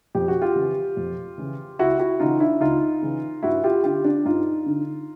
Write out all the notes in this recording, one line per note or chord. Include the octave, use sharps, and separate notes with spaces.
F2 G4
F#4
F4 G4
C#3 E3
F2
C#3 E3
C#2 E4 F#4
E4 F#4
C#3 E3 D#4 F4
D4 E4
C#2 D#4 F4
C#3 E3
G2 E4 F#4
F4 G4
D3 F4 G4
D4
G2 D#4 F4
D3